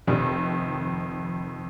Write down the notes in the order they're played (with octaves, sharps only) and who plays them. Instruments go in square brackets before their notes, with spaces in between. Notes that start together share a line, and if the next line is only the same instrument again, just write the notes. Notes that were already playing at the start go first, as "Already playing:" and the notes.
[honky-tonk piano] F1 F2 D#3